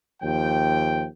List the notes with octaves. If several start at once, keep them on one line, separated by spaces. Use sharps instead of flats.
D#2 F3 G5